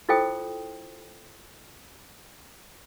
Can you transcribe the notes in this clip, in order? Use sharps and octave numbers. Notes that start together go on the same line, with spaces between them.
E4 F4 A4 C5 G5 D#6